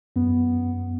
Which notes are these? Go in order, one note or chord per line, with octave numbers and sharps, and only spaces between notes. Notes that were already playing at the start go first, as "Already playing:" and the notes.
F#2 B3